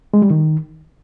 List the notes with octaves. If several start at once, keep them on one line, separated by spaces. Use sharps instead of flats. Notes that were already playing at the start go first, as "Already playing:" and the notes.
G#3
G3
D#3